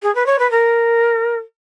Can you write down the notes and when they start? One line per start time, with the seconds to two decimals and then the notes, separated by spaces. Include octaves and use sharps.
0.02 G#4
0.15 B4
0.26 C#5
0.39 B4
0.51 A#4